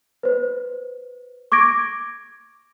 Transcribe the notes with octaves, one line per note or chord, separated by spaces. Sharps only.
B4 C5
C#6 D6 G#6 A#6 D7